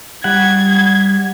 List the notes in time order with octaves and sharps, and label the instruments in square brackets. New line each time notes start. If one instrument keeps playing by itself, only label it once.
[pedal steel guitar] G3 F#5 [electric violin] G#6